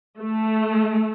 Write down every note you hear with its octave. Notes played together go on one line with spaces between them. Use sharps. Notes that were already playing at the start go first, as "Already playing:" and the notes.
A3